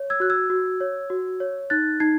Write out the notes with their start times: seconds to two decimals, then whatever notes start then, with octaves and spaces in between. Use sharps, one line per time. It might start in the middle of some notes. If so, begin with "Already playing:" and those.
Already playing: C#5
0.10 E6 G#6
0.20 F#4 F#6
0.30 E6 G#6
0.50 F#4
0.80 C#5
1.10 F#4
1.40 C#5
1.70 D#4 F#6 A6
2.00 D#4 G#6 C7